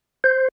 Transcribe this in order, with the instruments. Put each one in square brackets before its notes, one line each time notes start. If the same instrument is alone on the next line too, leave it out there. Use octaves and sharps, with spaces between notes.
[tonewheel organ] C5